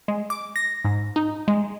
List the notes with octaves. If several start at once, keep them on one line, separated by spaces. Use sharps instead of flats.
G#3
D6
A#6
G#2
D#4
G#3